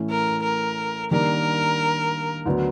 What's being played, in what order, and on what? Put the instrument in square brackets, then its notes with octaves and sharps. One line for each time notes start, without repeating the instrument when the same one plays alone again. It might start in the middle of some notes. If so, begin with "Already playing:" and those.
Already playing: [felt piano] A2 E3 A3 C#4 E4
[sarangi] A#4
A#4
[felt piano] D#3 G3 A#3 D4 [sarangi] A#4
[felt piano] D2 D3 F#3 B3